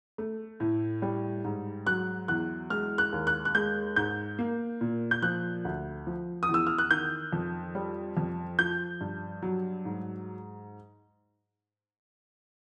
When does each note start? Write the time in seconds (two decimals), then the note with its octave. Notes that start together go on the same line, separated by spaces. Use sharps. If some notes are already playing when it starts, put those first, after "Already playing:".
0.18 A3
0.60 A2
1.02 G3
1.44 G#2
1.86 F#3 F#6
2.28 E2 F#6
2.70 G#3 F6
2.98 F#6
3.13 D#2
3.27 F#6
3.45 F#6
3.55 G#3 G6
3.96 G#2 G6
4.39 A#3
4.81 A#2
5.11 G6
5.22 F3 F#6
5.65 D2
6.07 F3
6.43 D#6
6.49 E2
6.54 E6
6.67 F6
6.78 F#6
6.91 D#3 G6
7.33 F2
7.75 G3
8.17 F2
8.59 F3 G6
9.01 G2
9.42 F#3
9.85 G#2